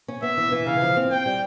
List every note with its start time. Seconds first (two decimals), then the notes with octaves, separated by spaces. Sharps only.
0.08 C#4
0.22 B3 E5
0.37 E3
0.52 E3
0.67 C#3 F5
0.81 F3
0.97 C4
1.11 C4 G5
1.26 G3